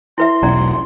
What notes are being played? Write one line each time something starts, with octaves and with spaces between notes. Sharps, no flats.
E4 B4 E5 C6
E1 B1 C#4 D5 A#5